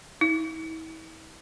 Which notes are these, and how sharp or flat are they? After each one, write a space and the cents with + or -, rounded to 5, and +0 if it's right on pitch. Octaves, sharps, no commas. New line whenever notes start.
E4 -40